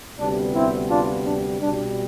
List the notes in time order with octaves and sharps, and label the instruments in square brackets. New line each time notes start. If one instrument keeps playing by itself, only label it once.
[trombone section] D2 C3 G3 B3 D4
C4 E4
D4 F4
D4
C2 B2 G3 D4